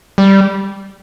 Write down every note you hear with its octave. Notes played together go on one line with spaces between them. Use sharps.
G3